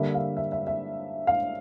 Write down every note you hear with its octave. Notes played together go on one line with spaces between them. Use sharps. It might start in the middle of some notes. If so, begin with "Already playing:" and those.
Already playing: D3 G3 A#3 E5
F5
E5
E5
E5
F5